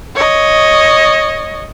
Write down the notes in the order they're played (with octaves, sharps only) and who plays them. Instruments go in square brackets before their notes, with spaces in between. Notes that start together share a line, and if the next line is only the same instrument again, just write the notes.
[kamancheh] C#5 D#5